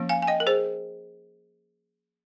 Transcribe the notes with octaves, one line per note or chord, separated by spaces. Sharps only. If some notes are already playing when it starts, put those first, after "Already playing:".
Already playing: F3 A#3 C#4
F5 G#5
G#5
D#5 G5
A#4
G#4 C5